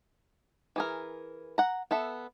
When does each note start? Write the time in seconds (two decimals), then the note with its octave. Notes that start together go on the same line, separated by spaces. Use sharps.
0.76 E3 G#4 A#4
1.58 F#5 A#5
1.91 B3 A4 E5